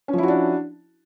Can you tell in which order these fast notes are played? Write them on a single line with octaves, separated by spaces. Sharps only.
C#4 F3 E4 F#4 D4